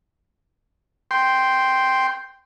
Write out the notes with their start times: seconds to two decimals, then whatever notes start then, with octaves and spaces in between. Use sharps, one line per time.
1.11 G5 C6